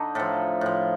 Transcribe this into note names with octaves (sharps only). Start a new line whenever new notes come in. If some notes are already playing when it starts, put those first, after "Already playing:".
Already playing: D3 D#4
A2 F3 A4
A2 F3